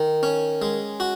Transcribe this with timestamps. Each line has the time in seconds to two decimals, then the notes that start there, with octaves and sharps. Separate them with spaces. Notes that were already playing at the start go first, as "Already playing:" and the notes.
Already playing: D#3
0.23 C#4
0.62 G#3
1.00 F#4